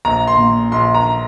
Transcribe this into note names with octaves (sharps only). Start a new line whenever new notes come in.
A#1 A#5
C6
A#2
A#1 C6
A#5